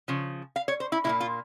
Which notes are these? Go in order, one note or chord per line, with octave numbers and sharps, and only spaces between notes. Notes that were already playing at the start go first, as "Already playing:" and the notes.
C#3 F3
F5
C#5
C5
E4
A#2 G3 A#3 E4
F4